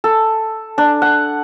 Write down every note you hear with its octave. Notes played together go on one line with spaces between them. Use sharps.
A4
D4
F#5